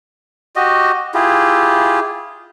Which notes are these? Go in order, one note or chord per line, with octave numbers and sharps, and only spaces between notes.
F#4 G4 D#5
E4 F4 G4 G#4